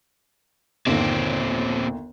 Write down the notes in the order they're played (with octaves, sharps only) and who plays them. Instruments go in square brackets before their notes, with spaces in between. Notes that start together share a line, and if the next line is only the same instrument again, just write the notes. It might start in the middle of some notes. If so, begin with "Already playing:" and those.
[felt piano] G1 D#2 [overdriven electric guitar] A#2 C4